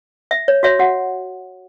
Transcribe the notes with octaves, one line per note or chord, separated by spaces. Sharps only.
E5
C#5
F#4 C#5 E5
F#4 F#5